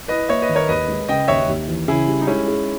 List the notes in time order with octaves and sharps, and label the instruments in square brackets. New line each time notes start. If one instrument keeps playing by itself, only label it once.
[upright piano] E4 [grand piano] B4 D#5
[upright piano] A#3 [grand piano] C#5 E5
[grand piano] B4 D#5
[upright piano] D#3
[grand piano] A#4 C#5
[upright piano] D#2 [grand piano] B4 D#5
[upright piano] G#3
[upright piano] C#3 [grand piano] D#5 G5
[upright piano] D#2 [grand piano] C#5 E5
[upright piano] D#2
E3
[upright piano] C#3 [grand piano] E4 G#4
[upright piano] G3
[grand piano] D#4
[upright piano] G#3 [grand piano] C#4 E4
[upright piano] G#4